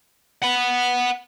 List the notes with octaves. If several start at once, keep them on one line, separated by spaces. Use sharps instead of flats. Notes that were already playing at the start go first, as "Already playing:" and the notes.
F#5 B5